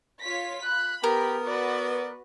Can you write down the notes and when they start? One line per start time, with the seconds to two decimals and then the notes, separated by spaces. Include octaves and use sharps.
0.21 F4 C#5 B6
0.64 B5 F#6
1.04 B3 G4 A#4
1.45 F#4 B4 D5